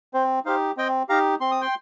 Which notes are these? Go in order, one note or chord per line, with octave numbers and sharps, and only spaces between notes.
C4 C5
D#4 G4 C5 F5
C4 D#5 G5
D#4 G4 F5 A#5
C4 C6
D#6
G5 C6